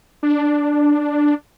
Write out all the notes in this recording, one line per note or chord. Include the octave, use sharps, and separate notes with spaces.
D4